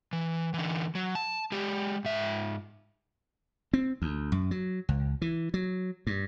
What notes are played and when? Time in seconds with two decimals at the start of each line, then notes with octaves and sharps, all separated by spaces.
0.13 E3
0.54 D3 E3
0.95 F#3
1.15 A5
1.52 G#3 G4
2.05 G#2 E5
3.73 C4
4.02 D2
4.32 F#2
4.51 F#3
4.89 C#2
5.22 E3
5.54 F#3
6.07 G2